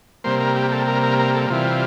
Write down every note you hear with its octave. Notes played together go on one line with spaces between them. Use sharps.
C3 G3 A#3 C5
A#4
G4
A4
A#4
A#4
A#4
A4
C3 E3 G3 F4